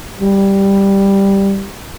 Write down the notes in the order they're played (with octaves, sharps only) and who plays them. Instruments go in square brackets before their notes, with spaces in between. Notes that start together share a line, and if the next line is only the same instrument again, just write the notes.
[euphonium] G3